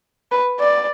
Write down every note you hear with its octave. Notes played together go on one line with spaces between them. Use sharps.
B4
D5